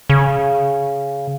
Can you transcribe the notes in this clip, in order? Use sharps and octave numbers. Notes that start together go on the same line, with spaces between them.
C#3